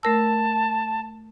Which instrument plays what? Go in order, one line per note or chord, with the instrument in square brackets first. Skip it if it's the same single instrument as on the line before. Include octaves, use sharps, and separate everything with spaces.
[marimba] A3 A#4 E6 [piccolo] A5